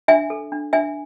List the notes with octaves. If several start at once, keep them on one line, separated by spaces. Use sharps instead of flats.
D4 E5 G#5
A4
D4
D4 E5 G#5